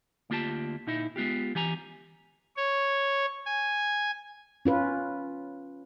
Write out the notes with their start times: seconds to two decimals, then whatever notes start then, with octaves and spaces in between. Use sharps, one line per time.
0.30 D2 A#3 F4 G4 A5
0.87 A#2 D#4 E4
1.16 G#3 B3 F4 G4
1.55 E3 G4 G#5 A#5
2.57 C#5
3.46 G#5
4.65 C#4 F4 B4